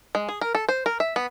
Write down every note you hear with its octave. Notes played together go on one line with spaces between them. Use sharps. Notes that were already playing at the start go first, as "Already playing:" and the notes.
G#3
G#4
A#4
A4
C5
A#4
E5
B3